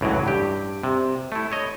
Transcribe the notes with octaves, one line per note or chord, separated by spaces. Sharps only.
C#2 A2 E3 F#3
G2 G4
C3
A3 E4
C#5 D#5